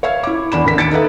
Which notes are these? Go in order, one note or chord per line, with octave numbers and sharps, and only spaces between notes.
C#5 E5 F5 G#6
E4 D6
E2 D4 B5 E7
A1 D3 A#4 B6
D#2 A6 C#7 D7
D#4 A4 B4 E5